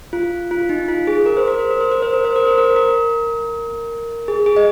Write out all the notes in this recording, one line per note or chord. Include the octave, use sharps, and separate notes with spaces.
F4
F4
D#4
F4
G#4
A#4
C5
A#4
C5
A#4
C5
A#4
C5
A#4
C5
A#4
C5
A#4
A#4
G#4
G#4
D#5